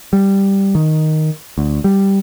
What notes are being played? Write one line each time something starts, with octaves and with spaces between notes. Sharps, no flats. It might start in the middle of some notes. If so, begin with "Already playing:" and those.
G3
D#3
D2
G3